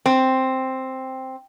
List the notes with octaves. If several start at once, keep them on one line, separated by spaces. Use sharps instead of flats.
C4